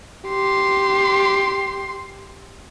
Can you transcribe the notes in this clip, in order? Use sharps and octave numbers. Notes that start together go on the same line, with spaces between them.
G4 C6